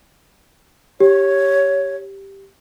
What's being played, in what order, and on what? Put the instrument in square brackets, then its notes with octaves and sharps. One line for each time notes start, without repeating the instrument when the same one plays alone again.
[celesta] G4 [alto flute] C#5